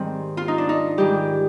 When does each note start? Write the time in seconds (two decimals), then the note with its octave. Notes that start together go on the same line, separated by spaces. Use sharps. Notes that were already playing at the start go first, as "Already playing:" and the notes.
Already playing: G#2 D#3 G3 C4
0.37 F4
0.48 D#4
0.58 D4
0.69 D#4
0.98 G#2 D#3 G3 G4